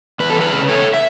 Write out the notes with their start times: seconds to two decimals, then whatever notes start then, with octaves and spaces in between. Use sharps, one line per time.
0.20 E2 B4
0.30 A4
0.36 E3 G#4 B4
0.53 C#3
0.69 E2 A4 C#5
0.94 E5